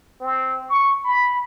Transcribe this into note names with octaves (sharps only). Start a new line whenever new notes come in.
C4
C#6
B5